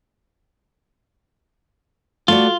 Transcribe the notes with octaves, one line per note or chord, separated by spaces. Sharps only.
A3 F4 F#4 D5